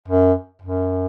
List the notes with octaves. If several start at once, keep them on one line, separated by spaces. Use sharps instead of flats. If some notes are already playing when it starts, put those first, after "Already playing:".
F#2
F#2